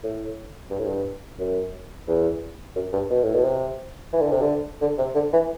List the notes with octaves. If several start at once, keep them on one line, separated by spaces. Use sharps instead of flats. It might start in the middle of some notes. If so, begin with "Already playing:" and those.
A2
G2
A2
G2
F#2
E2
F#2
G2
B2
A2
B2
C3
E3
D3
C3
D3
D3
C3
D3
E3